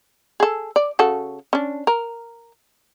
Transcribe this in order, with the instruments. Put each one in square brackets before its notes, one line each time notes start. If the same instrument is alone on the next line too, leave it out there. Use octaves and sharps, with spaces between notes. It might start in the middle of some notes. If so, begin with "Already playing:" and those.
[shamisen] G#4 A4
D5
C#3 F#4 A4
C#4 D4
A#4